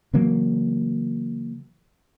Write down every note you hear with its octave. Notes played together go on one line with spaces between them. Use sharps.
C#3 E3 F#3 A#3